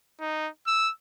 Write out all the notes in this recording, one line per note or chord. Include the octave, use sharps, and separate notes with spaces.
D#4
E6